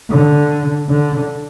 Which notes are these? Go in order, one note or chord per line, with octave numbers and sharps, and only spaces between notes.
D3
D3